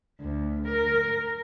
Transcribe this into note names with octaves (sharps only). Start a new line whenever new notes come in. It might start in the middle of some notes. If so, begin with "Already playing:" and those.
D2
A#4